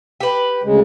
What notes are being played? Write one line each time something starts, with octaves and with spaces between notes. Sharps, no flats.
G4 B4
D2 C#3 G#3